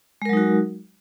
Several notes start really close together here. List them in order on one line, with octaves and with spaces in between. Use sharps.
G#3 A#4 F#3 D#4 F#4